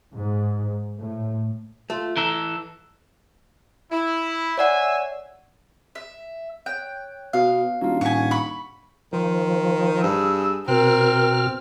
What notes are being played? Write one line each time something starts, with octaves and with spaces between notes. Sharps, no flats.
G#2
A2
A3 F4
E3 A4 A#5
E4
C#5 D5 E5 F#5 G#5
E5
C#5 G5 F#6
B2 F5
D#1 D4 D#4 F4 F#4 F5
A2 F#5 G#5 C#6 B6
B5 C#6
D#3 F3
G2 G#4 E6
B2 C4 A#4 F6